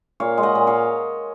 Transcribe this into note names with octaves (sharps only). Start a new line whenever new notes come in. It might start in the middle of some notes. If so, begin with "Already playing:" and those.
A#2 C#5 F5
G#3
D#5 F#5
A#2
C#5 F5